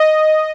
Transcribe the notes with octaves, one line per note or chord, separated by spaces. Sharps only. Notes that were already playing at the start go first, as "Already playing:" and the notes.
Already playing: D#5